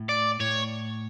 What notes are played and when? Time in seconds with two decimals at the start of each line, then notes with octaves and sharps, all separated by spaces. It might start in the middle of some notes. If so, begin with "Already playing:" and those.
Already playing: A2
0.09 D5
0.40 A2 C#5